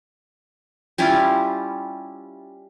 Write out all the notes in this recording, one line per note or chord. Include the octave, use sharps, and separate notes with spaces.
G3 C#4 E4 F4